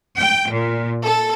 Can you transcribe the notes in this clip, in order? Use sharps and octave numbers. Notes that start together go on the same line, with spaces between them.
G5
A#2
A4